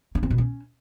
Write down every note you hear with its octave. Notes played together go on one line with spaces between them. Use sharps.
C#4
C4
B2
C#4